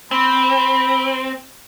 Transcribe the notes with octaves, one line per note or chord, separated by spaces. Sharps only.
C4 B5